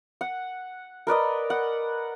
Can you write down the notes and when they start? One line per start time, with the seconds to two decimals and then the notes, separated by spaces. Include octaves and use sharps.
0.21 F#5
1.07 A#4 B4 D5 D#5
1.50 F#5